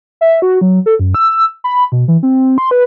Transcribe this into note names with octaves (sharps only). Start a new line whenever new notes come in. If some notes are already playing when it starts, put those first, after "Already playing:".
E5
F#4
F#3
A4
F#2
E6
B5
B2
E3
C4
C6
B4